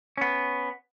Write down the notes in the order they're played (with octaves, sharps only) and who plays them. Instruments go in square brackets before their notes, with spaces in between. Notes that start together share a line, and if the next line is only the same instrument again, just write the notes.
[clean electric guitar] B3 C#4